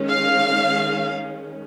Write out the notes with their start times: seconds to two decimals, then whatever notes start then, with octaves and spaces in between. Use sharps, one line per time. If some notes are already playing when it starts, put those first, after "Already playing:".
Already playing: D#3 G#3 C#4
0.08 F5